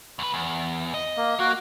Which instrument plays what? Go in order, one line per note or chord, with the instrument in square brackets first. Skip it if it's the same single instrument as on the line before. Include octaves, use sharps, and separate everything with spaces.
[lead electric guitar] D2 B4
E2
D#5
[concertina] A#3
[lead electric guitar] A#3 [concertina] F#4